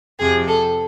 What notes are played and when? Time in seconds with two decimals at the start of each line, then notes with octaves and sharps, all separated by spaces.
0.19 F2 C3 F3 G#4
0.48 A4